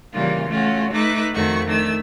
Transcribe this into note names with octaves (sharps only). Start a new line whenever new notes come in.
C#3 E3 G3 A#3 F4
A3 C#4 F4 F#4
A3 D#4 B4 E5 D6 F#6
F2 D#3 A3 F#4 C#6
D#3 A3 D4 E6